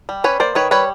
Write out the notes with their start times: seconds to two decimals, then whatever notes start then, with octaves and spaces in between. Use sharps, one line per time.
0.09 G3
0.24 C#4 B4 C#5
0.40 A#3 C5 D5
0.55 D#3 B4 C#5
0.71 G3 B4 C#5